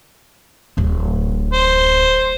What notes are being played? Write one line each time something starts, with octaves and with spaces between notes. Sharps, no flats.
D1 A1
C5